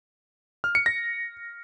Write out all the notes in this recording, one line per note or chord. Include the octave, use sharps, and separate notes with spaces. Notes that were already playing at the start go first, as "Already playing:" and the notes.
F6
C#7
A#6